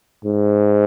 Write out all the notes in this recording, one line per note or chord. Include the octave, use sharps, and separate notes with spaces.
G#2